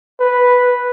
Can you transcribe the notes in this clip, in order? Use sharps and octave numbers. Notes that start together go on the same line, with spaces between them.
B4